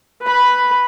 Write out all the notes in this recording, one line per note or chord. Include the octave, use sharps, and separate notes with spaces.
B4 B5